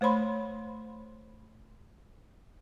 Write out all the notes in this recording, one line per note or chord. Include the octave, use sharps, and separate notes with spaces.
A3 C5 C#5 B5 C6